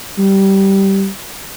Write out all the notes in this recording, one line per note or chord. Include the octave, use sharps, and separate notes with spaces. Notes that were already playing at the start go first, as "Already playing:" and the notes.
G3